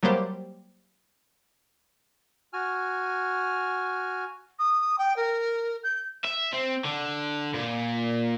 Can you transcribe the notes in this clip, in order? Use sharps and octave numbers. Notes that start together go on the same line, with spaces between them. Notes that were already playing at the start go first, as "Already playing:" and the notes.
F#3 G3 A#3 G4 C5
F#4 G#5 F6
D#6
G5
A#4
G6
E5
C4
D3
A#2